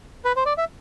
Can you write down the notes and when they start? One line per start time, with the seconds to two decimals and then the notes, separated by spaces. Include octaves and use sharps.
0.25 B4
0.36 C5
0.46 D5
0.58 E5